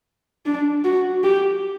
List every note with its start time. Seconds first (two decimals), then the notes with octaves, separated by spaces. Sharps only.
0.46 D4
0.85 F#4
1.24 G4